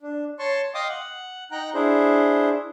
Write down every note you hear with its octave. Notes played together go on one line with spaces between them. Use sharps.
D4
C#5 A5 C6 C#6
D#5 F5 G5 C6 D6 D#6
F#5
D#4 F#5 G5 A#5 F#6
D4 E4 G#4 C5